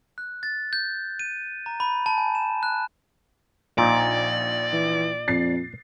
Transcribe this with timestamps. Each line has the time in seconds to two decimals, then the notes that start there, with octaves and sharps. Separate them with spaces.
0.18 F#6
0.43 A6
0.73 G6
1.19 D#7
1.66 A#5
1.80 B5
2.06 A5
2.18 G#5
2.35 E7
2.63 F#6
3.78 A#1 A#2 D#4 D5
4.72 E3
5.28 F2 A6 C7